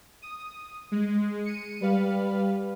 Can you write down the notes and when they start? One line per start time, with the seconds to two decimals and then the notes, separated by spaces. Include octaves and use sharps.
0.22 D#6
0.91 G#3
1.43 C#7 D#7
1.81 G3 B4 F5